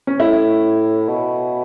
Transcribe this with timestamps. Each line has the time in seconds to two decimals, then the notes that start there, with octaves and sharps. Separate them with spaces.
0.07 C#4
0.19 A2 E4
1.08 B2